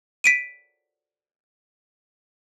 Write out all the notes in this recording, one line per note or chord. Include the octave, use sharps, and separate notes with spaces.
B6 D7 D#7